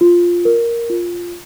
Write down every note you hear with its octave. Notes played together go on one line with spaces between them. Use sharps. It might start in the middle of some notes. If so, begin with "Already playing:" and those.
F4
A#4
F4